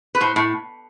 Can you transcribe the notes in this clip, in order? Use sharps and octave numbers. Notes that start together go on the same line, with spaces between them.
B4
A2 C5
A2